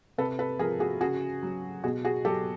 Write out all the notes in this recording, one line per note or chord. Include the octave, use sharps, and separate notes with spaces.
C3 A4 B4
A4 B4
F3 G#4 A#4
F#4 G#4
C#3 F#4 G#4
F#3
B2 F#4 G#4
F#4 G#4
F#3 G4 A4